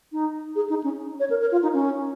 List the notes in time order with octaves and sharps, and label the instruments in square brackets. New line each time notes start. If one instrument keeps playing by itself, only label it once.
[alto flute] D#4
G#4
D#4
C#4
C#5
A#4
A#4
F4
D#4
C#4